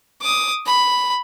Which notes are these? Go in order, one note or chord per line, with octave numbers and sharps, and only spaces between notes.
D6 D#6
B5